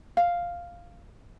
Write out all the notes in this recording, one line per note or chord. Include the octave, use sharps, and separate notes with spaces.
F5